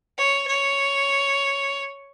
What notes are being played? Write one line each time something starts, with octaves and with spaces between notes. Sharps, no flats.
C#5
C#5